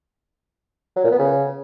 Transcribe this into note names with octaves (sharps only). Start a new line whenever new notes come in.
F#3
A#2
B3
C#3